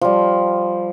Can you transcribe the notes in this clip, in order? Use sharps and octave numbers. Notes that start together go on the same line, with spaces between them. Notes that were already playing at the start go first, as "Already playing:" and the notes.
F3 G3